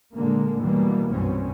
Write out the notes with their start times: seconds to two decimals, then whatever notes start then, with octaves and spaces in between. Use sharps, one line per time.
0.13 A#2 D3 G#3 A#3
0.59 D#2 B2 E3 F#3 G3 A#3
1.12 C2 G2 B2 C4 C#4